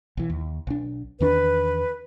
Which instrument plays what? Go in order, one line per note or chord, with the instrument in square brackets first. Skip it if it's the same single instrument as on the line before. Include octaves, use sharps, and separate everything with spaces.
[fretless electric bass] B1 E3
D#2
B1 D4
[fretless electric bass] E2 D#3 D4 [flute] B4